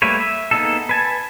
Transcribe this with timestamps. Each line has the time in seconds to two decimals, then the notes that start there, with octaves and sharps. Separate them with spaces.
0.02 G3 A3 A#3 B4 C#5
0.20 E5
0.51 A#3 B3 D#4 G#4 A4
0.89 B4 G#5 A5